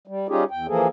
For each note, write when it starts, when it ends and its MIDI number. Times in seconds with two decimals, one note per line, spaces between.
0.07 0.27 55
0.29 0.44 55
0.29 0.44 61
0.29 0.44 63
0.29 0.44 65
0.29 0.44 67
0.29 0.44 68
0.51 0.67 40
0.51 0.67 79
0.68 0.88 52
0.68 0.88 53
0.68 0.88 58
0.68 0.88 68
0.68 0.88 69